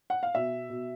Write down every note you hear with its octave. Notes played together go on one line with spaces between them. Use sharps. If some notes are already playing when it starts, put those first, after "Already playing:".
F#5
F5
B2 E5
B2